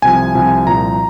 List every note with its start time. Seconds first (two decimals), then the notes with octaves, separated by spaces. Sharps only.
0.02 C2 C3 F3 G#5
0.35 C2 C3 F3
0.67 C2 A#2 F3 A#5